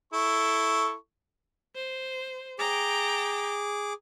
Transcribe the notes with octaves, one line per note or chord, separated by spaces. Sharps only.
E4 A4 C#6
C5
G#4 G5 A#5 D6